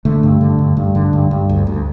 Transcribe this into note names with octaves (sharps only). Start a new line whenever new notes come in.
D3 A3
G2
D3
G2
G2
D3
G2
G2
D2
D2